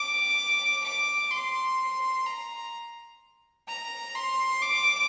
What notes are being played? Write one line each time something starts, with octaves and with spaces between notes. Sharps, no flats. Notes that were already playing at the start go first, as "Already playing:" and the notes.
Already playing: D6
D6
C6
A#5
A#5
C6
D6